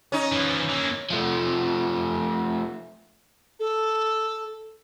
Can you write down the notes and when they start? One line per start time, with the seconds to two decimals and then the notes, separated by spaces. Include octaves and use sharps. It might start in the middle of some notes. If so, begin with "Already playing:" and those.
0.12 C#4 D#4
0.32 E3 F3
0.69 E3 A#3
1.10 F3 A3
3.60 A4